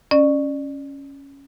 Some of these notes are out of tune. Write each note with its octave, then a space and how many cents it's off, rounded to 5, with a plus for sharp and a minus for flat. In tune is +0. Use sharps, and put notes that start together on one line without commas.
C#4 +0 D5 +30